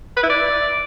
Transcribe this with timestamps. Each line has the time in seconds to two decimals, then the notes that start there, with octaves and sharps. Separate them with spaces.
0.17 B4
0.23 E4
0.29 D5